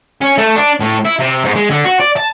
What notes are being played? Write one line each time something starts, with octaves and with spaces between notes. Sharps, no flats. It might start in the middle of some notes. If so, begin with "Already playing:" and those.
C#4
A3
D4
A2
E4
C3
G#2
G#3
D3
F#4
D5
A5